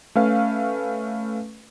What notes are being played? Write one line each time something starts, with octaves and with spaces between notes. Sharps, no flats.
A3 C#4 B4 F5